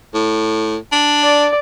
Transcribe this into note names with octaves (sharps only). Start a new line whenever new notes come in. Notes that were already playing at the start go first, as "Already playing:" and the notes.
A2
D4
D5